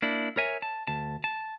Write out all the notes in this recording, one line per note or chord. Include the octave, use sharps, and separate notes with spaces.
A#3 D4 E4
A#4 C#5 E5 G#5
A5
D2 A5
A5